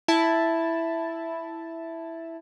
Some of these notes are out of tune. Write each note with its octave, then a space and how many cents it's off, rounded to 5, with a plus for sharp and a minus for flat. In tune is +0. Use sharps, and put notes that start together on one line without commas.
E4 +0 A5 +0